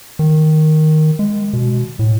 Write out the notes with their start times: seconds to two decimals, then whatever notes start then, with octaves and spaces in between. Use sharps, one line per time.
0.19 D#3
1.19 G#3
1.53 B2
1.99 A2